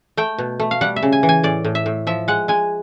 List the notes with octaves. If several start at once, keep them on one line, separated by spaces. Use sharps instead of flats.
A3 G5
B2
A3
F5
G3 F#5
E5
C#3
G#5
E3
G#5
A2 D5
A2
E5
A2
F3 E5
G#3 F#5
G#3 G#5